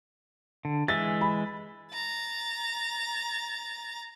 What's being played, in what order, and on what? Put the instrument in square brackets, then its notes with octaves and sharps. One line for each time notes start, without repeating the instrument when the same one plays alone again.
[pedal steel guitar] D3
[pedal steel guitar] E3 G#3 E5 [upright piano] A6
[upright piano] B5
[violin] A#5 A6